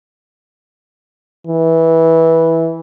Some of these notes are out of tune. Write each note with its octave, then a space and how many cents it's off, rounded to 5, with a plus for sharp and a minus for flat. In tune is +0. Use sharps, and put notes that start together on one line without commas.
E3 -15